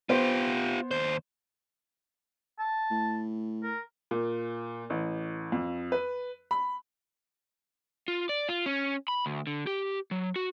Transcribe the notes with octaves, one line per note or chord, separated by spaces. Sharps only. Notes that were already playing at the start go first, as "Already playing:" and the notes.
B3 F4 G4 C5
D#2 C5
A5
A2
A#4
A#2
A1
F2
B4
B5
F4
D5
F4
C#4
B5
D2
D3
G4
F#3
F#4